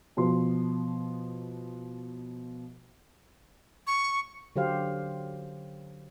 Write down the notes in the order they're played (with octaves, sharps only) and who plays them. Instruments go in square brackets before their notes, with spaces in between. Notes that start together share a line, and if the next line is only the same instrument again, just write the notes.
[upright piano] B2 F3 C6
[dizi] C#6
[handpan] D3 F#3 G4 C5 F5